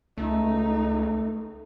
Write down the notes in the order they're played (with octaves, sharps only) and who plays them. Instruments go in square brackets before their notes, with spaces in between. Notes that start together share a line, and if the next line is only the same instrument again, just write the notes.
[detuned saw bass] C#2 [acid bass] A3 [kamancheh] D#4